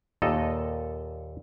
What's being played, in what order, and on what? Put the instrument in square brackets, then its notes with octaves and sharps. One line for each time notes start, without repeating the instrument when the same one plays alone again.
[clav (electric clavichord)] D#2 A#2 A4 D#5